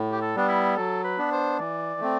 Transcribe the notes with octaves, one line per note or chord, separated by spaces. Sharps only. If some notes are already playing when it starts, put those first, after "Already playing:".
Already playing: A2
G4
A4
G3 B3 D4
E4
F#3 A4
B4
B3 D4
C5
E3 D5
A3 C4